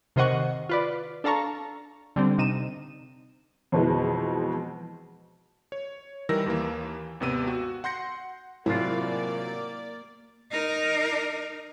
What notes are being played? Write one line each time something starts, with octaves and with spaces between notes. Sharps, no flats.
C3 D#3 C5 D#5 F#5 C#6
F4 B4 D5
D4 A4 F5 A5 A#5 C#6
D3 G3 C4
C3 D#4 D#7 E7
F2 B2 E3 G#3
C#5
D#3 E3 G3 A#4 E6 A#6
D#2 E3 A#3
G#1 D#2 C3 B3 E6 D#7
F#4
F#5 C6 G6 A#6 C#7
G#1 A2 C3 F#3 A#3 E4 F4 D5
D#4 A#4